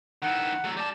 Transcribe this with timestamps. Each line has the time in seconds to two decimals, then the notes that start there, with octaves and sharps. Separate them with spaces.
0.22 D#3 E4 F#5
0.64 F#3 A3
0.77 G3 D5 A5